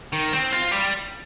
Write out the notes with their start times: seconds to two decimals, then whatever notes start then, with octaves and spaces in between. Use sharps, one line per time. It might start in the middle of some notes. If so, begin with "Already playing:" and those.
0.13 D#3
0.33 C4
0.52 F4
0.71 G3